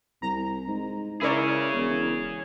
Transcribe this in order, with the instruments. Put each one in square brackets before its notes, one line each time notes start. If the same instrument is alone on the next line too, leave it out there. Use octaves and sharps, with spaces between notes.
[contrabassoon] C2 [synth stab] A#5
[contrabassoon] G#2
[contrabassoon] C#3 [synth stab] E4 A#4 D5 [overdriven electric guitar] G#4 C#5
[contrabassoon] E1